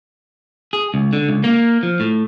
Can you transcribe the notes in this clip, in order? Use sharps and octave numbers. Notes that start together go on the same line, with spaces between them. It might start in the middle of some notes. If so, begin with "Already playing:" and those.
G#4
C#2
D3
C#2
A#3
F3
A2